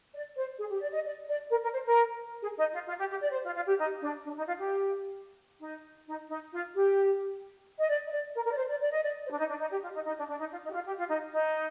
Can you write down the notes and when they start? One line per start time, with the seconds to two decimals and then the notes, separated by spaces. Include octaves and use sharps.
0.14 D5
0.37 C5
0.58 G#4
0.70 G4
0.81 D5
0.93 D#5
1.04 D5
1.27 D5
1.50 A#4
1.62 A#4
1.72 C5
1.85 A#4
2.42 G#4
2.56 D#4
2.72 F4
2.87 F4
2.98 G4
3.09 G4
3.21 D5
3.32 C5
3.44 F4
3.55 F4
3.66 G4
3.78 D#4
4.01 D4
4.24 D4
4.35 D#4
4.46 F4
4.59 G4
5.60 D#4
6.06 D#4
6.29 D#4
6.52 F4
6.75 G4
7.79 D#5
7.89 D5
8.07 D#5
8.11 D5
8.35 A#4
8.46 A#4
8.52 D5
8.57 C5
8.69 D5
8.81 D5
8.91 D#5
9.01 D5
9.25 C5
9.32 D4
9.38 D#4
9.48 D4
9.60 D#4
9.71 G4
9.83 F4
9.94 D#4
10.06 D#4
10.17 D4
10.29 D4
10.39 D#4
10.51 F4
10.63 D#4
10.70 G4
10.74 F4
10.85 G4
10.97 F4
11.08 D#4
11.31 D#4